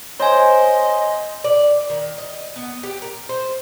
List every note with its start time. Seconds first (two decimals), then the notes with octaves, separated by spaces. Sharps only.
0.20 C5 C#5 D#5 G#5
1.44 D5
1.90 D#3
2.18 D#5
2.56 B3
2.83 G4
3.02 A#4
3.29 C5